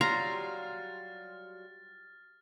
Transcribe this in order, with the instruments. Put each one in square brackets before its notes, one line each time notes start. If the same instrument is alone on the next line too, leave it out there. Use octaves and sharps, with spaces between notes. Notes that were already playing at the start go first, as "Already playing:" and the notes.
[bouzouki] F#3 G3 F4 [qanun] A#5 [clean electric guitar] C6 [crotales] F6 A6